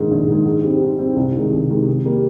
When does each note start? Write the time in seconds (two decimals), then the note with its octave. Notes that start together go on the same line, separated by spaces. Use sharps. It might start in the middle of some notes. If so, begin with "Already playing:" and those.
Already playing: A#1 G#2 D#3 G#3
0.11 A#1
0.28 G#2 D#3 G#3
0.45 G#2
0.64 G3 C4 G4
0.82 G#2
0.99 G3 C4 G4
1.16 C2
1.34 C3 D#3 G#3
1.53 C2
1.69 C3 D#3 G#3
1.87 C3
2.05 G3 A#3